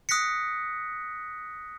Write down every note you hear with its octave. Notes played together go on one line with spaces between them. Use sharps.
D#6 F#6 A#6 B6 C#7